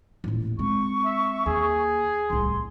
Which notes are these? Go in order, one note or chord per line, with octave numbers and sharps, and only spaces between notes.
D#1 A1
G#3 C4 C#6
E5
D#2 G#4
D1 C2 C6